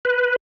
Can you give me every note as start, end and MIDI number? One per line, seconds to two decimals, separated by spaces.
0.05 0.36 71